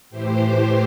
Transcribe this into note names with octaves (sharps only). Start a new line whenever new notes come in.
A2 E3 G4 C5